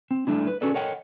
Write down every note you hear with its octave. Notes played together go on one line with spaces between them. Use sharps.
C4
G3 A3 D4 E4
B4
C#4 F#4 G#4 A4 B4 D5
A4 A#4 C#5 D#5 F#5 G5